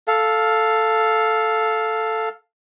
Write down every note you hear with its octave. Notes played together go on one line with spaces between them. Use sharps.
A4 F5